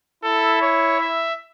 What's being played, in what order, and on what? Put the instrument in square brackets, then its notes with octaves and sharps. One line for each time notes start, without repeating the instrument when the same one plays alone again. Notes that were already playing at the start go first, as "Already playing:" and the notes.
[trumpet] E4 [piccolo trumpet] A4
[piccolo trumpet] C#5
E5